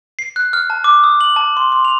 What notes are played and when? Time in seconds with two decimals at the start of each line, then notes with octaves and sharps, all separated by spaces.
0.19 C7
0.36 F#6
0.53 F6
0.70 A5
0.84 D6
1.04 D#6
1.21 F#7
1.36 A5
1.57 C6
1.72 C6
1.85 F7